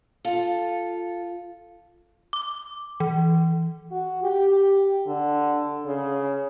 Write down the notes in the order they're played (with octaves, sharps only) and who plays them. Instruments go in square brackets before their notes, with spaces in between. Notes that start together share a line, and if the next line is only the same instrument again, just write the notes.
[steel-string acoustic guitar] F4 A4
[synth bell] D6
E3
[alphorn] F#4
G4
D3
C#3